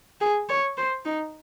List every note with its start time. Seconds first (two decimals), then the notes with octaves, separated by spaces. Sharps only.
0.21 G#4
0.49 C#5
0.77 C5
1.05 D#4